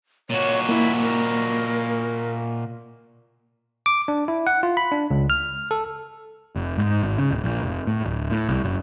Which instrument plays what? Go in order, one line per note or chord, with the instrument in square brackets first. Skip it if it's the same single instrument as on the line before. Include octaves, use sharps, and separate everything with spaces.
[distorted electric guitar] A#2 F#4 [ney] C#5
[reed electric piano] A#3 [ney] E4
[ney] A#4
[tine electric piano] D6
D4
E4
F#5
F4
B5
D4
C#2
F6
A4
[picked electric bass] F1
G#2
G#1
C#3
D1
A#1
F1
A2
D1
A2
C2
F#1